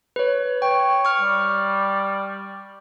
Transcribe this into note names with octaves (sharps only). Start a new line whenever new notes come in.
B4 C#5
C#5 G5
C#6 F6
G3